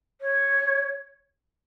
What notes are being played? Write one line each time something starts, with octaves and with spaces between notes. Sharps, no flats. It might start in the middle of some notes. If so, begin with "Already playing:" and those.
C#5